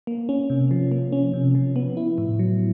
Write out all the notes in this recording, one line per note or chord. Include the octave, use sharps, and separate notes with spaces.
A#3
C#4
C3
F3
A#3
C#4
C3
F3
B3
E4
A2
F#3